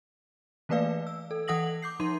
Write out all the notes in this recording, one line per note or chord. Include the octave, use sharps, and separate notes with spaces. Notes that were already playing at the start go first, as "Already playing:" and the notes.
E3 A3 A#3 B4 D5 F5
E6
A4
E3 A4 F#5 D#6 A#6 F#7
D6 G6 C7
F3 D#4 C6 D#7